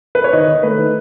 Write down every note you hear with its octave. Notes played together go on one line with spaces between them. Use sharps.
B4
C#5
D#3 D#5
D#3
A3 B4
D#3